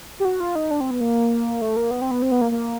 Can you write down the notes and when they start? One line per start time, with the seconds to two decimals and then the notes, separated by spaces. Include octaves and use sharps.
0.20 G4
0.25 F#4
0.40 F4
0.55 D#4
0.71 D4
0.81 C4
0.91 B3
1.01 A#3
1.62 A3
1.76 A#3
1.91 B3
2.02 C4
2.11 B3
2.22 C4
2.31 B3
2.41 A#3
2.52 A#3